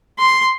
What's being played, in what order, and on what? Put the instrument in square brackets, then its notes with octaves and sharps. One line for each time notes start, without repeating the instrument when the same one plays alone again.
[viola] C6